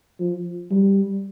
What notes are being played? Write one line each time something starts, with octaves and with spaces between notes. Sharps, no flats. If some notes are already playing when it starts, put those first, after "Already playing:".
F3
G3